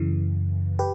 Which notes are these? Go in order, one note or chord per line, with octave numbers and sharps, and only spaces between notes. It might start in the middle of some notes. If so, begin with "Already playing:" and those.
Already playing: F#2 C#3 E3
G4 B4